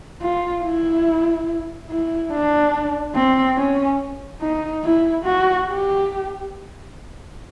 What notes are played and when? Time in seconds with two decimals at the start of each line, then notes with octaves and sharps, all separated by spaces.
0.22 F4
0.63 E4
1.90 E4
2.32 D4
3.15 C4
3.57 C#4
4.41 D#4
4.84 E4
5.25 F#4
5.68 G4